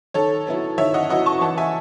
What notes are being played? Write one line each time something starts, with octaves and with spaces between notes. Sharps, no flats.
D#3 A4 C#5
F#3 B3 E4
D#3 C#5 E5
D#5 F#5
F#3 B3 E4 D#5 F#5
A5 C#6
E3 F#5 A5
E5 G#5